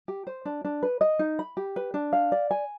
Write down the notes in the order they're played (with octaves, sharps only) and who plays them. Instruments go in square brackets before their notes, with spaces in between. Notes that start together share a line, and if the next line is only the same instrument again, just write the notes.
[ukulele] G4
C5
D4
D4
B4
D#5
D#4
B5
G4
B4
D4
F5
D5
G#5